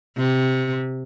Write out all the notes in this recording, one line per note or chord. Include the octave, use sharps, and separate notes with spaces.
C3